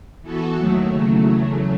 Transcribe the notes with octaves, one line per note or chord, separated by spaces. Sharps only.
E3 B3 F#4 A4
D#2 D#3 F#3 A3
E2 C#3 F#3 A3